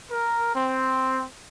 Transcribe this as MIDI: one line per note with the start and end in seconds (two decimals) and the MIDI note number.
0.11 0.54 70
0.55 1.24 60